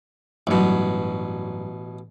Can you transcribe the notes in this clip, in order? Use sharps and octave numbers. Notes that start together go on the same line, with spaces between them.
A1 G2 B2 F#3